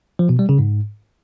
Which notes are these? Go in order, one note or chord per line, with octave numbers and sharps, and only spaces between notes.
F3
B2
G3
C#3
G#2